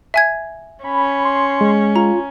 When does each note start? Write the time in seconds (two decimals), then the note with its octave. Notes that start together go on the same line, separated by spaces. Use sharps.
0.14 E5 G#5 G#6
0.84 C#4 B5
1.25 C6
1.61 G#3
1.96 F4 A#5